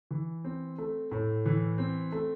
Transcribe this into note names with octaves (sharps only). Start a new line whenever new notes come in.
E3
C4
A3
A2
E3
C4
A3